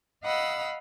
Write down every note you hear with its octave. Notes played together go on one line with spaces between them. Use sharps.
D#5 F5 F#5 B5 E6